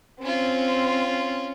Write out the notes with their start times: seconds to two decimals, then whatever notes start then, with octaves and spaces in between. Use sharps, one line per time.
0.22 C4 C#4 F4